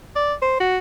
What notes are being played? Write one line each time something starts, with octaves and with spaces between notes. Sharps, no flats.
D5
C5
F#4